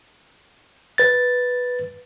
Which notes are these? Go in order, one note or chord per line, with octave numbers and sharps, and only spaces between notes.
B4 A6